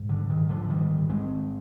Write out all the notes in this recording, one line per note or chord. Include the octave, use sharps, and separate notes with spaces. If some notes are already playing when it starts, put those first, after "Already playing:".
Already playing: G#2
D3
D#3
D3 F3
D#3 G3
G#3 C4